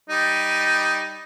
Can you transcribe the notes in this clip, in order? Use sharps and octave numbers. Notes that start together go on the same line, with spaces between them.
G3 D#4